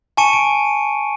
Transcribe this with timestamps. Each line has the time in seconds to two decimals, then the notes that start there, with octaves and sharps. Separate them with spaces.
0.17 G#5 A5 C#6 C#7 D#7
0.33 D7